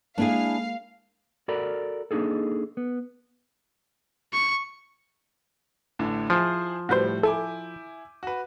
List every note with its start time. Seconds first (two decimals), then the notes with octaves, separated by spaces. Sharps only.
0.18 G#3 A#3 D4 E4 G#4 F5
1.48 F#4 A4 A#4 D5 A#5 B5
2.11 A#3 D4 D#4 G#4 A4
2.77 B3
4.33 C#6
5.99 A1 A2 D3
6.30 F3 E4 G#4 C5
6.89 A2 G3 F#4 B4 C5 G6
7.23 E4 A4 G#5 D6
8.23 F#4 B4